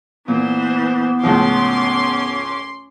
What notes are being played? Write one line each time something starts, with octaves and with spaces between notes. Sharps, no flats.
A#2 E3 B3 C5
C#2 A2 F3 C#4 C6 D6